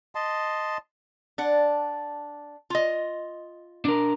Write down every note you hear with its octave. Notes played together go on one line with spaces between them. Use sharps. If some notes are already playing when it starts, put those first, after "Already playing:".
D#5 A5 C6
D4 F#5
F4 D#5
D4 A#4